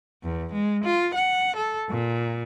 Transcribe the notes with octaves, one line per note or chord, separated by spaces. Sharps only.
E2
G#3
F4
F#5
A4
A#2